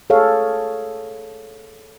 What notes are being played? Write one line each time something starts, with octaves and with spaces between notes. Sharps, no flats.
G#4 A4 C#5 F5